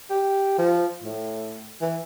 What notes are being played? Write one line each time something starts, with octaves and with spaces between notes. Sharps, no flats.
G4
F3
A2
E3